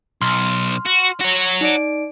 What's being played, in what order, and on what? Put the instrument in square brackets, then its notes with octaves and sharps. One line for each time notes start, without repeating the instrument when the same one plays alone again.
[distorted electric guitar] B1 [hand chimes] C6 F6
[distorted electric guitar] F#4
F#4 C#5
[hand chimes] D#4 D5 D7